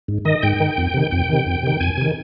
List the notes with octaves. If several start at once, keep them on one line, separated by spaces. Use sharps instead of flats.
G#2
D#3 D#5
G#2 G5
D#3
F2
C3 D#3
F2 G5
C3 D#3
F2
C3 D#3
F2 G#5
C3 D#3